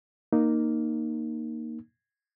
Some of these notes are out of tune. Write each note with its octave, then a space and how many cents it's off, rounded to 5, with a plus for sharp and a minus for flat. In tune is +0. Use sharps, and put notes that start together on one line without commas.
A#3 +0 D#4 -15